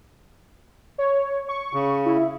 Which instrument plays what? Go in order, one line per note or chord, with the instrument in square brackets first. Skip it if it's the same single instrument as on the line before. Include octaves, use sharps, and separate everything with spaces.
[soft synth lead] C#5
C#6
[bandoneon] C#3
[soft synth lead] E4